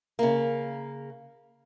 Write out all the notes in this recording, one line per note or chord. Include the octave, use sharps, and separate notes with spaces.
C#3 A#3